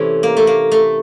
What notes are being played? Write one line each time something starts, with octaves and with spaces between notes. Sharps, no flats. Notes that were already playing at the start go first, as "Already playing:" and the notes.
Already playing: C3 E3 A3 C#4
A#3
A3
A#3
A3